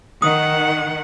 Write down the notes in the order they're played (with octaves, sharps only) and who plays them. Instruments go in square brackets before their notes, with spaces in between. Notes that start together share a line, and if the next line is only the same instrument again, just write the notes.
[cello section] D#3 [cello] F#5 [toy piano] D#6